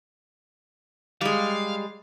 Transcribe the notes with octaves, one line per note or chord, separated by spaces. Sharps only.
G3 G#3 F5